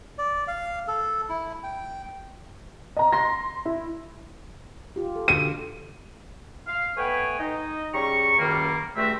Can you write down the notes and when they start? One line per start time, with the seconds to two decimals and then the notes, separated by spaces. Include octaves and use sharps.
0.18 D5
0.48 F5
0.88 A4
1.29 E4
1.63 G5
2.97 D#5 A#5
3.13 C6 A#6
3.65 E4
4.96 F4 G4
5.16 A4
5.28 D3 F#4 D#7
6.67 F5
6.97 A3 B3 B4 C#5 G5 G#5
7.40 D#4 D#5
7.94 C#3 G3 A#5 C#6
8.39 C#2 F#2 D#3 G3 A#3
8.96 C#2 G3 A3 C4 F#4 E5